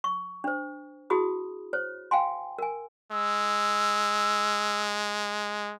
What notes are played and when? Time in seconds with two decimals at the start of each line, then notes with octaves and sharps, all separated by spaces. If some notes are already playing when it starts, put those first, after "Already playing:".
0.04 C#6
0.44 D4 C5
1.10 E4 F#4 G#4 B5 D#6
1.73 C5 C#5
2.11 F5 G5 G#5 C6
2.59 A#4 G#5
3.12 G#3 E6